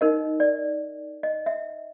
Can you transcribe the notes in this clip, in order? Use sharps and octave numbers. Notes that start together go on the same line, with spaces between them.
D#4 A#4 D#5
D5
D#5
E5